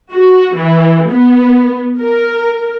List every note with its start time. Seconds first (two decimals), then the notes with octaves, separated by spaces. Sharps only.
0.12 F#4
0.55 E3
1.10 B3
1.99 A#4